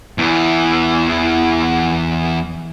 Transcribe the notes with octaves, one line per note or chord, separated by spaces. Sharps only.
E2 E3